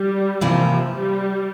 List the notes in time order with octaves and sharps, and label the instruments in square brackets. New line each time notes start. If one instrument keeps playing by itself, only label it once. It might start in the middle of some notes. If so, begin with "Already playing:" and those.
Already playing: [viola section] G3
[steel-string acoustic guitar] C3 E3 A#3 E4 [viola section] F3
[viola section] G3